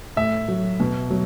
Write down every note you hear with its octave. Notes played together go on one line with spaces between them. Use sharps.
A2 E5
F#3
B2
F#3